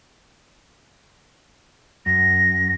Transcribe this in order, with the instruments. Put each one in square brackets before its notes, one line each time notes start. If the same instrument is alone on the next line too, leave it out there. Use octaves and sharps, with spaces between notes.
[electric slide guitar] F#2 [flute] A#6